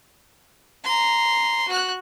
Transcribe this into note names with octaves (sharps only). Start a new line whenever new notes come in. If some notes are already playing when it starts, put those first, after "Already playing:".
A#5 C6
F#4 F#6